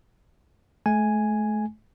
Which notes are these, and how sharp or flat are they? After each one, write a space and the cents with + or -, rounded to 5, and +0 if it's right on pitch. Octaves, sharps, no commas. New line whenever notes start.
A3 -40 G#5 +0